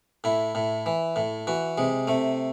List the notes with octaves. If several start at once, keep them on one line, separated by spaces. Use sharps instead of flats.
A2 E4
A2
E3
A2
E3 F#4
C3 G#3
C3 A3